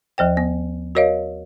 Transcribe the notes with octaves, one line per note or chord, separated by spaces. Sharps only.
D#2 F3 C5 G5
B3
F#4 A#4 C#5 D#5 F5